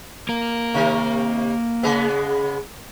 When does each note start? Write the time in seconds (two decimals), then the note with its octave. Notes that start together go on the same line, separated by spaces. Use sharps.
0.29 A#3 A#4
0.74 C3 D#3
1.83 C#3 G#3 B3